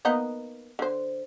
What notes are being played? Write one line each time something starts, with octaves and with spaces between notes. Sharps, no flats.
A#3 B3 D#4
D3 C5